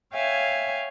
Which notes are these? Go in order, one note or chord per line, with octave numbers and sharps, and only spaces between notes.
C#5 E5 F5 G5 G#5